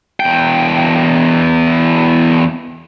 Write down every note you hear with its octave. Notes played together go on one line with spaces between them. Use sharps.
E2 G5